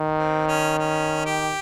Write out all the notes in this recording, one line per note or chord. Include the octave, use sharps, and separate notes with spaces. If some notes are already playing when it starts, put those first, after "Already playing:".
Already playing: D#3
C4
C#4
C#4
G4